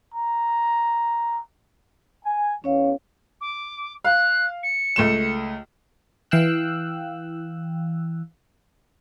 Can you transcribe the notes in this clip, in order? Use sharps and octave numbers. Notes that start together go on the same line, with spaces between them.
A#5
G#5
E2 C#4 C#5 F5
D6
F5 F#6
C#7
C#2 A3 E7
E3 F5 G5 E6 F#6